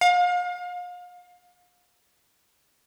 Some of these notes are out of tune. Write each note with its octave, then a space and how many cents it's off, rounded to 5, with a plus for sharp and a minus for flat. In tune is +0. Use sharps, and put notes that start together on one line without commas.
F5 +35